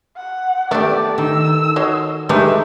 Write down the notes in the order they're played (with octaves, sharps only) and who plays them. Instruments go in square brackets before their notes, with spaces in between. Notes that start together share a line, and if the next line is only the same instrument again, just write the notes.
[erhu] F#5
[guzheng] A3 G4 [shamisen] B3 D4 [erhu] D5
[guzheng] D#3 [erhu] E6
[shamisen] F#4 C#5 D#5 [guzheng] C6
[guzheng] G#3 A3 D#4 [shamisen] G4 B4 [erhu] E5